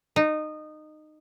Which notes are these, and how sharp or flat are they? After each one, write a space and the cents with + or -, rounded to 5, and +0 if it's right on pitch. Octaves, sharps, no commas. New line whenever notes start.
D#4 -20